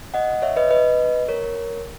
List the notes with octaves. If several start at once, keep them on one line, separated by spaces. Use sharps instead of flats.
D#5 F#5
C#5 E5
B4 D#5
B4 D#5
A#4 C#5